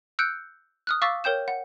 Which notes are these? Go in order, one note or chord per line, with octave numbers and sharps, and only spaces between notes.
E6 F#6 G6 C#7 D7
D#6 F6 F#6
F5 C#6 D6 E6 A6 B6
A#4 C#5 G5 G6 E7
F#5